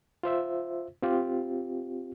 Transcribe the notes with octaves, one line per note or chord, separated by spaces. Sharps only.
F4 C5 E5
C4 F4 G4